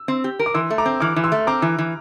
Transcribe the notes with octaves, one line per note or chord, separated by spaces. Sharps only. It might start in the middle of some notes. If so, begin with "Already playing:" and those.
Already playing: E6
C4
G4
A#4
D6
E3 C6 E6
A3
A#5 D6
C4
E3 D6 F6
E3
C6 E6
A3
C4 A#5 D6
E3
E3